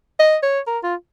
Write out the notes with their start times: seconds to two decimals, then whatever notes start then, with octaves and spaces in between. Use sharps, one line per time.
0.19 D#5
0.43 C#5
0.67 A#4
0.83 F4